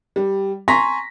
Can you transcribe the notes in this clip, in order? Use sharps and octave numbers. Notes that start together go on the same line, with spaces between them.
G3
G#5 A#5 C6 C#6 A#6 B6